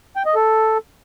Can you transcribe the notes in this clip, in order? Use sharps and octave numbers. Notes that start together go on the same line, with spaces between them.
G5
D#5
A4